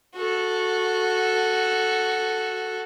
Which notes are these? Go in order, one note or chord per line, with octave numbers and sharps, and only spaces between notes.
F#4 A4